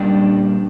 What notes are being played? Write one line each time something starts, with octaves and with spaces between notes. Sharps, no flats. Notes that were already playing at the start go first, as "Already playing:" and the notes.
Already playing: A#2 G3 D4 G5